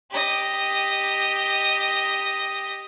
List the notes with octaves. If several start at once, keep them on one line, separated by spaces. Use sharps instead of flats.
G4 D#5